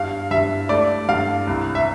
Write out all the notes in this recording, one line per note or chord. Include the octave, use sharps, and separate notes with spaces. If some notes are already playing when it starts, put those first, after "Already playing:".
Already playing: G2 F5
G2 E5
A3 D5
G2 F5
C2
E5